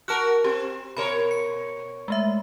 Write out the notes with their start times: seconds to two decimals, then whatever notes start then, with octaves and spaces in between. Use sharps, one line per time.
0.08 F#4 A#4 A5 F6 F#6
0.44 C4 G4
0.97 B2 A#4 C#5 B5
1.31 C#7
2.08 G#3 A3 E5